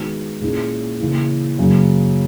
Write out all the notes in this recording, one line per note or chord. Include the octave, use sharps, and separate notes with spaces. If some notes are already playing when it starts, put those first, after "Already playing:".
Already playing: D#3 G#3 B3 F#4
A#2 A#3 C#4 E4 G#4
C#3 E3 A#3
F#2 C#3 F#3 A#3